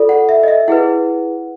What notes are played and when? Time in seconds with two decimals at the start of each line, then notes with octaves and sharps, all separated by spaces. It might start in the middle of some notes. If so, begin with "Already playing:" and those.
Already playing: F4 A4 D5
0.09 F#5
0.29 E5
0.43 D#5
0.48 E5
0.68 E4 G#4 B4 F#5